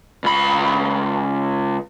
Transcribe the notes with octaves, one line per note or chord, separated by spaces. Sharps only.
C#2 B5